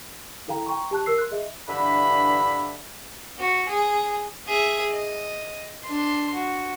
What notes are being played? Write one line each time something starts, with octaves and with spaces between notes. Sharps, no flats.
E4 A4 F5 G5 A#5
G5 A#5 C6 C#6
G4 A5 F#6
A#4 E6 C7
C6 F#6
G#4 D#5 E5
G2 D3 E3 E5 B5
F#4
G#4
G#4 E5
D#5
D4 C6
F#4